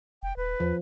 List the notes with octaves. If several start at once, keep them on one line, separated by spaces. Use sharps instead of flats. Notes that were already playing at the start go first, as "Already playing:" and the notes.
F1 G5
D#1 B4
E2 F3